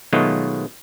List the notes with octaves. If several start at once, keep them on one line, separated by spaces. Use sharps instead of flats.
B2 D#3 F#3 G#3 A3 F4